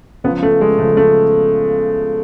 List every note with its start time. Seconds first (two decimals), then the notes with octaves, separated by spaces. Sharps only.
0.24 C#2 C#3 F3 B3
0.43 A3
0.61 G#3
0.79 C#2 C#3 F3 A3
0.97 A3